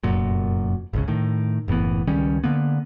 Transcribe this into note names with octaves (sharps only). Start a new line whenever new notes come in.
F1 F#2 A#2
G#1 C#2 C#3
A2 D#3
F#1 A2 E3 B3
C#2 D#3 G3 C#4
D3 A#3 B3